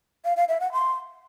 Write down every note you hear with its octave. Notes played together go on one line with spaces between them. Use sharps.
F5
F5
E5
F#5
C6